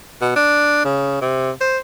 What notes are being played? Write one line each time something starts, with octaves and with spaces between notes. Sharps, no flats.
B2
D4
C#3
C3
C5